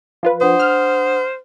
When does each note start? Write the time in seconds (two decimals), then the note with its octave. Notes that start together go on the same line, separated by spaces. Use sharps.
0.23 F3 F4 B4
0.41 D4 C5 F#5 D#6
0.59 F6